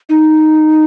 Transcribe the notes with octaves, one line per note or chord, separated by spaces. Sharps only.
D#4